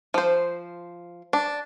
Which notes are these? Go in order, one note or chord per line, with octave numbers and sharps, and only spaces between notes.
F3 C5
D4